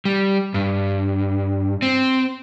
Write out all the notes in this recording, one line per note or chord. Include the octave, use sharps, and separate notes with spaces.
G3
G2
C4